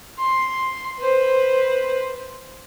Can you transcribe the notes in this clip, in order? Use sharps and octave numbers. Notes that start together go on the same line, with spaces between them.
C6
B4 C5